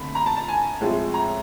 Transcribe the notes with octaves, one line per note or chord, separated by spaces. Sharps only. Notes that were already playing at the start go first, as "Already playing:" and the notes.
Already playing: D3 A3 C4 B5
A#5
A5
A5
G#5
A2 F3 G#3 C4
A#5